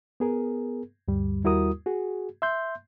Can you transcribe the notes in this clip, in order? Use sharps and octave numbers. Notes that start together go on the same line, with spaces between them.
B3 G#4 A#4
D2 G2 G3
D#2 G3 E4 F#4 A#4 D#6
F#4 G#4
E5 C6 G6